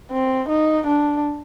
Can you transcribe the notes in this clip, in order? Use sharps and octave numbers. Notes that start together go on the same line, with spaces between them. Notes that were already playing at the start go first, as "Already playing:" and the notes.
C4
D#4
D4